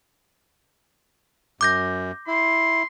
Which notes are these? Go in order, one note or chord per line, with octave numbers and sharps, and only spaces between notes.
F#2 D6 G6 A#6
E4 C6